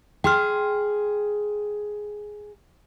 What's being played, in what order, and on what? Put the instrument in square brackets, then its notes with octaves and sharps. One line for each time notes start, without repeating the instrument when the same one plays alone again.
[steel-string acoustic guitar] G#4 [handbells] G5 C6 F6